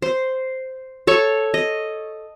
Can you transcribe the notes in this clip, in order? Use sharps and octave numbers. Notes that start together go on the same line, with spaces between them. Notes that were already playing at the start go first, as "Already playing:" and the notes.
C5
A4 C#5 C#6
D#5